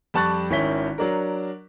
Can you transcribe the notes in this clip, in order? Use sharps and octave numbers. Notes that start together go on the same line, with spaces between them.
F2 G3 A5 C#6 F#6 A6
G#1 D#3 C#4 E4 B6 G7
F#3 D4 A#4